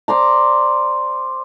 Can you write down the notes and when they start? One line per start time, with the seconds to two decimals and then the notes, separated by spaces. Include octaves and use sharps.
0.08 C5 D5 A#5